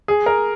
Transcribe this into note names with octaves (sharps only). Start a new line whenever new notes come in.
G#4
A#4